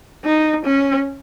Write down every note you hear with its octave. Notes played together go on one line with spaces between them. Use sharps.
D#4
C#4